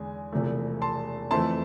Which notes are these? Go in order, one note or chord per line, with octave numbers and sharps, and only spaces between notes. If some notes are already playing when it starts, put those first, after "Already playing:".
Already playing: E2 D3 G#3 G#5
E1 E2 C3 F3 A3
A5 C6
F2 E3 A3 C4 E4 A5 C6